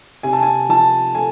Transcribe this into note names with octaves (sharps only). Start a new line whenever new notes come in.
C3 G#5
A5
G#5
F3 A5
A3 G#5